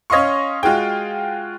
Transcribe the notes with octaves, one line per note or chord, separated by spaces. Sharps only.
C#4 C#5 D#5 F5 C6 C#6
G#3 F4 F#4 G#4 G5